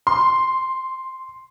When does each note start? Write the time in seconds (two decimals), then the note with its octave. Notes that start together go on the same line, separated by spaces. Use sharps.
0.07 C6